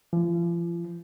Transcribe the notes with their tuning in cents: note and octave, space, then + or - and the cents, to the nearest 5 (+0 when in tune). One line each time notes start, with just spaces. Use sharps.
F3 -40